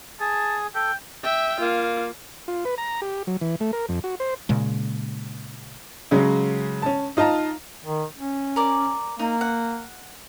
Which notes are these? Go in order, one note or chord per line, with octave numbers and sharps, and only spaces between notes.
G#4 A5
A4 G5
E5 G5
A#3 F4
F4
B4
A#5
G4
F#3
E3
A3
A#4
F2
F#4
C5
A#2 C#3 G#3
C#3 F#3 G#3 C#4
C#4 A5
D#4 F4 D#5 A5 A#5
D#3
C#4
A#4 D5
A#3 D#4
F#5